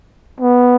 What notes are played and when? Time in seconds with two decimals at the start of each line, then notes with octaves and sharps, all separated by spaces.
0.40 B3